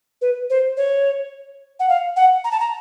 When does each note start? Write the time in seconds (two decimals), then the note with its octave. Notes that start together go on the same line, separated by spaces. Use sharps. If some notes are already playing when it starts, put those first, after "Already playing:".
0.21 B4
0.50 C5
0.77 C#5
1.80 F#5
1.89 F5
2.16 F#5
2.44 A#5
2.52 A5
2.60 A#5